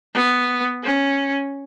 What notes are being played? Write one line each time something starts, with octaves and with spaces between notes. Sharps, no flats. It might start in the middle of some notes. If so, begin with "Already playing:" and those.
B3
C#4